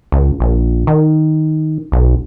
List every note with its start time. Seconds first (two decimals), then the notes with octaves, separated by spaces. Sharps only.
0.12 C#2
0.40 A#1
0.87 D#3
1.92 B1